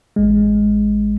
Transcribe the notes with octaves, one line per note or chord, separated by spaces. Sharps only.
A1 G#3